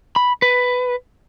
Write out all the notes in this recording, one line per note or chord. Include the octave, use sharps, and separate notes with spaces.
B5
B4